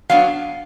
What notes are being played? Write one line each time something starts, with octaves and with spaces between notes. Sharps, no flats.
F#3 B3 D4 F5